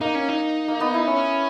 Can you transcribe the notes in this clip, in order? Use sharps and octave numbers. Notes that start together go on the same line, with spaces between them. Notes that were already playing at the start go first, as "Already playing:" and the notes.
A#3 D#4
C#4
D#4
A#3
B3
E4
C#4